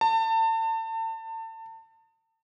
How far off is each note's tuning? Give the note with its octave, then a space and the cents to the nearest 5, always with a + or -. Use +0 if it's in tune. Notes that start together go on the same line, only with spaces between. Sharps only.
A5 +35